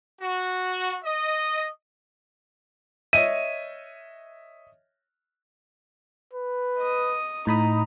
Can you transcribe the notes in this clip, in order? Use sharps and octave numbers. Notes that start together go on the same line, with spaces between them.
F#4
D#5
C#5 D#5 E5 D#7
B4
D#5 D#6
A2 D#4 A#5 B5 D#6